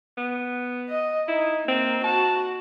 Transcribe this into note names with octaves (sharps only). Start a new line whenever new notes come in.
B3
D#5
D#4 E4
A#3 C4
F#4 A5